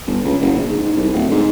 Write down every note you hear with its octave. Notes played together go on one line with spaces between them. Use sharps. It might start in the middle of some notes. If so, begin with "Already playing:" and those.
G1
C#2
F#1
A#1
G#2
C2
D1
G#2